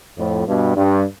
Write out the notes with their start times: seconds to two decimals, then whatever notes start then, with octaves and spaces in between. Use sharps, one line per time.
0.17 F2 A2
0.47 G2 B2
0.76 G2